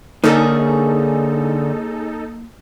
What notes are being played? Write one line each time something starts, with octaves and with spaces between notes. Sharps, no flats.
D3 A#3 C#4 D#4 G#4 A4